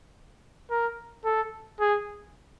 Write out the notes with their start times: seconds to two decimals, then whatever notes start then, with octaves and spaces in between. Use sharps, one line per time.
0.70 A#4
1.25 A4
1.80 G#4